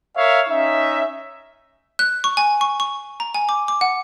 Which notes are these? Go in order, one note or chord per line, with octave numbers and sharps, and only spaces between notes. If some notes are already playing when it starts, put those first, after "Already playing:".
A#4 C#5 E5 F5
C#4 D#4 E5
F#6
C#6
G#5
C#6
C#6
A#5
G#5
D6
D6
F#5